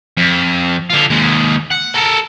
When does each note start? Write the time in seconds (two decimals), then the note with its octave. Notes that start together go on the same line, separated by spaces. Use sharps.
0.17 F2
0.90 D3 F4
1.10 D#2 G#3
1.71 F#5
1.94 A4 A#4